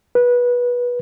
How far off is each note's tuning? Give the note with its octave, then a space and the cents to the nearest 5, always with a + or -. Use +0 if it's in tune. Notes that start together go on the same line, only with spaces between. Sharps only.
B4 -20